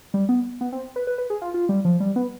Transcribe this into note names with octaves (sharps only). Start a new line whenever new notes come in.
G3
B3
B3
C4
B4
B4
B4
G#4
F4
F4
G3
F3
G3
B3